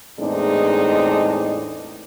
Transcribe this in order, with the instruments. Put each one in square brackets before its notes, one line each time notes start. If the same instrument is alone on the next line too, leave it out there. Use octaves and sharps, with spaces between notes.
[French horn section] E2 A2 G#3 C4 D4 D#4